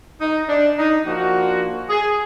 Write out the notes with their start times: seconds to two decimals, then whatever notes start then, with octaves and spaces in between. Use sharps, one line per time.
0.21 D#4
0.49 D4
0.77 D#4
1.05 F3 A#3 D4 F#4
1.89 G#4